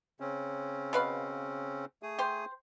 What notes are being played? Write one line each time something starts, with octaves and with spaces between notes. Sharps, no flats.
C#3 C4 C#4
B2 B4 F5
A3 G#4 D#6
G4 C5